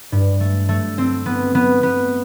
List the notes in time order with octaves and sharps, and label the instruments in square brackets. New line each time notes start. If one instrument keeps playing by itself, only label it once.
[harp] G2
A3
A3
C4
B3
B3
B3